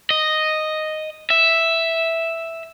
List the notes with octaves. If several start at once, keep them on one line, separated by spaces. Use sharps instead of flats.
D#5
E5